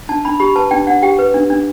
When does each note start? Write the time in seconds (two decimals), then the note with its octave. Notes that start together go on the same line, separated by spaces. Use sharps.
0.09 D4 A5
0.25 D4 B5
0.40 G4 B5
0.55 B4 A5
0.71 D4 G5
0.87 D4 F#5
1.03 G4 G5
1.19 B4
1.34 D4
1.50 D4